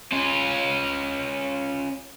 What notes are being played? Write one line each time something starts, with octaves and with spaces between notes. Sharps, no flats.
C#4 F4